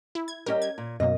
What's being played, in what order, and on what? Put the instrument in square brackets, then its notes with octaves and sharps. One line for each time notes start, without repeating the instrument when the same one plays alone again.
[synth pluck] E4
G#6
[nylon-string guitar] G3 G4 D#5 [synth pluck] C#4 A#4
[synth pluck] G#6
[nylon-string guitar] A#2
[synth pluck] F#2 B2 A#3 [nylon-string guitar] D#5